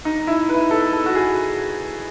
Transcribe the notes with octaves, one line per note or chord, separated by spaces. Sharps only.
D#4
E4
B4
A4
A4
F#4
G#4